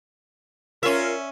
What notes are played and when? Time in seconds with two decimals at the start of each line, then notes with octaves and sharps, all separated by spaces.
0.83 C#4 F4 A#4 E5